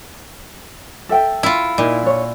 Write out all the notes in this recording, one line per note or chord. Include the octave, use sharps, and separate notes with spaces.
A4 E5 G5
E4 F4
A#2 D#4 E4
D4 C#5